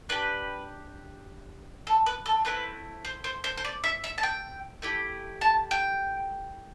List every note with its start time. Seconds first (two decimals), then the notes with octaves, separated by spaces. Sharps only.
0.09 D4 G4 B4
1.87 A4
2.06 B4
2.26 A4
2.45 A3 C4 E4 B4
3.05 C5
3.24 C5
3.44 C5
3.57 C5
3.65 D5
3.84 E5
4.04 E5
4.18 A5
4.23 G5
4.82 A3 E4 G4
5.41 A5
5.71 G5